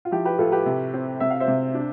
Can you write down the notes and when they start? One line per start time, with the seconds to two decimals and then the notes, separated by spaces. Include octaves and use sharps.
0.05 F4
0.11 F3 E4 G4
0.25 G4 B4
0.39 A2 F4 A4
0.52 G4 B4
0.66 C3
0.94 C4
1.20 C3 E5
1.30 F5
1.40 C5 E5
1.48 C3
1.74 D4